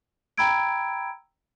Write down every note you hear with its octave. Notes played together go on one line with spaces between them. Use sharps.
G5 A#5 B5 E6 G#6 D7